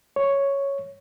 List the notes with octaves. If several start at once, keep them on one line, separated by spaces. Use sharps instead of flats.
C#5